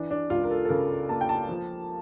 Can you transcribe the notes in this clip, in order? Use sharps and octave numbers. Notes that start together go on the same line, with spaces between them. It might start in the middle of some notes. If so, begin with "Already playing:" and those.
Already playing: E3 D4
D4
C#2 F4
A#4
A4
A4
C#3 A#4
A#3 A5
G5
A5
F3